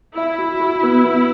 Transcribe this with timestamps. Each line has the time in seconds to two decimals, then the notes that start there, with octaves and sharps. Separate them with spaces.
0.17 E4 E5
0.38 F#4
0.60 F#4
0.83 B3
1.04 B3